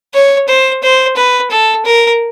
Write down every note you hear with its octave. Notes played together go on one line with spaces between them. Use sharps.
C#5
C5
C5
B4
A4
A#4